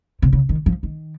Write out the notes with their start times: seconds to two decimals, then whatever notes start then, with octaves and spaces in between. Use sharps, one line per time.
0.22 C3
0.33 C#3
0.49 D#3
0.66 F3
0.83 D#3